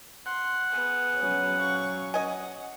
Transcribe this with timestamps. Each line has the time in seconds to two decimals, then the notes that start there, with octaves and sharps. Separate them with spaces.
0.26 F#5 C6
0.73 B3 G#4
1.18 F#3 C#4
1.58 F5 C#6
2.14 D#5 F#5 G#5